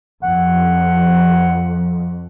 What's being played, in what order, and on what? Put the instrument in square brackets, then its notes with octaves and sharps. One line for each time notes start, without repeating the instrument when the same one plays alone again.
[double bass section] F2 [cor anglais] F#5